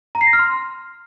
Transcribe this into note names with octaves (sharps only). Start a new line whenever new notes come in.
A#5
C7
A#6
F6
C6